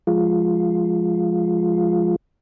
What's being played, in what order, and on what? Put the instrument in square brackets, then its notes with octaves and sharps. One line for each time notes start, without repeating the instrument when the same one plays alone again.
[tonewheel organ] F3 G#3 F4